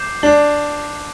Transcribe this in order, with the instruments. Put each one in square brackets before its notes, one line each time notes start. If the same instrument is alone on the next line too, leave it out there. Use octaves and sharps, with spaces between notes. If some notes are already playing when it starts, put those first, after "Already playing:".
Already playing: [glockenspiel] D6 G6 C7 E7
[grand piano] D4